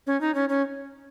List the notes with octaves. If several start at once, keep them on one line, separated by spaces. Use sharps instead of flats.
C#4
D#4
C#4
C#4